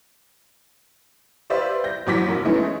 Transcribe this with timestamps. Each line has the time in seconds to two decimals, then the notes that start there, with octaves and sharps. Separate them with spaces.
1.50 G4 B4 C5 D5 E5 F5
1.84 G6 A#6
2.07 A#1 E3 F#3 D6 A#6 B6
2.28 F1 A#4
2.45 E3 G#3 A3 B3 C#4 D#4